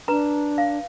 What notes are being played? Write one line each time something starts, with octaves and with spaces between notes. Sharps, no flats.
D4 B4 A#5
F5